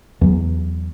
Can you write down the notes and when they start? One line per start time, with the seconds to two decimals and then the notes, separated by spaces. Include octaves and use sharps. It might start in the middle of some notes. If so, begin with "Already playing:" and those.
0.21 E2 F#3